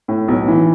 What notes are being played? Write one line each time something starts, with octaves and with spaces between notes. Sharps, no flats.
A2
B1
E3